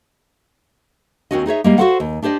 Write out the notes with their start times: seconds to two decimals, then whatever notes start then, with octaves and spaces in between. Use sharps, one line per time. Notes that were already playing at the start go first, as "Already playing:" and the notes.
1.31 D#2 F3 C4 C#4 F#4 D#5
1.46 D#4 G#4 C#5 E5
1.64 G3 G#3 A#3
1.78 F#4 G#4 A4 C5 F5 F#5
2.00 D#2
2.22 D4 G4 C5 D5 D#5